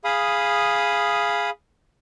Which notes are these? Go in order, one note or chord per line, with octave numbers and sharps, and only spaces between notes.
G#4 F5 B5 D#6